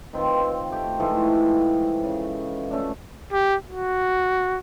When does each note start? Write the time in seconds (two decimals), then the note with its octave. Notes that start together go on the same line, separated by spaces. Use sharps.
0.13 D#3 C4 F4 B4
0.40 C4
0.70 A3 G4
1.00 G#2 E3 F3 A3
2.03 C#3
2.71 A3 C#4 D4
3.32 G4
3.68 F#4